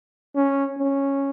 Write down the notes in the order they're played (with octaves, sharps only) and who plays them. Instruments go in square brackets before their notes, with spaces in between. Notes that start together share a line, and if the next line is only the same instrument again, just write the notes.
[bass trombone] C#4
C#4